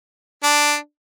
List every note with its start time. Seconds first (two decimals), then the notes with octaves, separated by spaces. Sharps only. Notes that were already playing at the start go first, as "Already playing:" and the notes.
0.43 D4